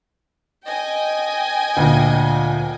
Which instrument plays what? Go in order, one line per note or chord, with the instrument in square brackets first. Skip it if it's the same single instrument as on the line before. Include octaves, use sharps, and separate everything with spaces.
[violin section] D#5 G5 G#5
[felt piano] D2 A#2